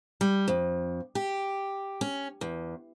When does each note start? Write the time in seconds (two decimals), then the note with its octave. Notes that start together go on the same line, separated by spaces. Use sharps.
0.21 G3
0.48 F2
1.15 G4
2.01 C#4
2.41 E2